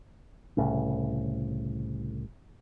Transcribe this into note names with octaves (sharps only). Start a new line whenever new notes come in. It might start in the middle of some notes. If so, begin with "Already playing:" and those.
C2 A2 C#3